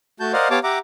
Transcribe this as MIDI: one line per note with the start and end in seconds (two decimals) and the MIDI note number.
0.20 0.32 57
0.20 0.32 66
0.20 0.32 81
0.20 0.32 91
0.33 0.48 70
0.33 0.48 72
0.33 0.48 74
0.33 0.48 75
0.33 0.48 77
0.33 0.48 78
0.50 0.59 59
0.50 0.59 67
0.50 0.59 73
0.50 0.59 77
0.50 0.59 81
0.50 0.59 86
0.64 0.79 67
0.64 0.79 76
0.64 0.79 78
0.64 0.79 82
0.64 0.79 86